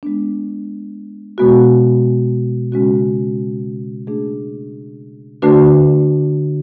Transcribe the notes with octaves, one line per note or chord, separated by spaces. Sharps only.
G#3 B3 D4
B2 G#3 B3 F#4
C#3 G#3 C#4 F#4
A3 D4 G#4
D3 A3 D4 F#4 B4